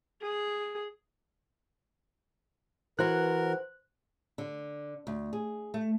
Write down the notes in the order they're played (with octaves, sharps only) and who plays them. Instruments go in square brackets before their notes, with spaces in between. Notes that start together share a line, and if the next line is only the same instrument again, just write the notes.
[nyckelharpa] G#4
[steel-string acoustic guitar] E3 F#4 [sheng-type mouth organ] A#4 [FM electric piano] C5 F#6
[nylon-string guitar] D3
D2
G#4
A3